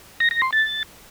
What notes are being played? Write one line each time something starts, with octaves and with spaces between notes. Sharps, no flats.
A#6
A#6
C6
A6